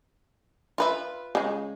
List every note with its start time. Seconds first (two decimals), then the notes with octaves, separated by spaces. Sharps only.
0.78 F4 B4 E5
1.35 C#3 G#3